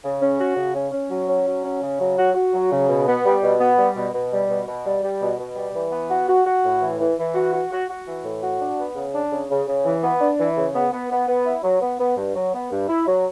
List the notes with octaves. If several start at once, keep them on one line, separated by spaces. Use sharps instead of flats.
C#3
C#4
F#4
C#3
C#4
C#4
F#3
C#4
F#3
C#4
C#3
F#3
F#4
F#4
F#3
C#3
B2
B3
G3
B2
B3
G3
B2
B2
G3
B2
B2
G3
G3
B2
B2
G3
E3
B3
F#4
F#4
F#4
A2
E3
E3
E3
F#4
F#4
F#4
F#4
E3
A2
F#4
D4
B3
C#3
D4
C#3
C#3
C#3
E3
B3
D4
E3
C#3
B3
B3
B3
B3
E4
F#3
B3
B3
G2
F#3
B3
G2
E4
F#3